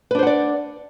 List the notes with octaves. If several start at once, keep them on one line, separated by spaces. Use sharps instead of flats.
D4 B4 C5 D5 F#5